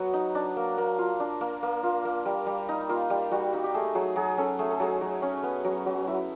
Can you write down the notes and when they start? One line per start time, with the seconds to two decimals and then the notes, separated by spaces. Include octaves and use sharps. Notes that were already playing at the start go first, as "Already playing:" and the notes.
Already playing: F#3 B3 F#4
0.14 D#4
0.35 D4
0.57 A#3
0.78 A#3
0.98 F4
1.20 D4
1.41 A#3
1.63 A#3
1.83 F4
2.05 A#3
2.25 G3
2.46 G3
2.69 D#4
2.89 A#3 F4
3.10 G3
3.31 G3 F#4
3.53 D#4
3.64 G4
3.74 A3 G#4
3.95 F#3 G#4
4.16 F#3 G#4
4.38 C#4 A4
4.59 A3 G#4
4.71 A4
4.80 F#3 G#4
5.01 F#3
5.22 C#4
5.43 B3
5.65 F#3
5.86 F#3
6.07 E4